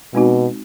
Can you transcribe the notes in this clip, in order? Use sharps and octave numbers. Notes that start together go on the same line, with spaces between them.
B2 G#3 C4 D#4 F#4